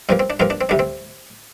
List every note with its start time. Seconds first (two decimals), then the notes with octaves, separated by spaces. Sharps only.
0.09 G2 F3 A#3 C4
0.19 C4
0.30 D4
0.40 G2 F3 A#3 C4 F4
0.50 D4
0.61 C4
0.69 D2 C3 G3 D4
0.79 C4